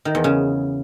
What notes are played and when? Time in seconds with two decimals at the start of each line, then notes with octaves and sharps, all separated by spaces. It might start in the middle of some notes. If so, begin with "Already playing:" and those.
0.05 D#3
0.15 E2
0.24 C#3